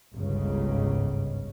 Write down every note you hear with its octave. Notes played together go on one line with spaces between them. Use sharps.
G1 C#2 G#2 C#3